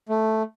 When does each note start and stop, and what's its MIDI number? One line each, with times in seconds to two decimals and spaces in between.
0.09 0.43 57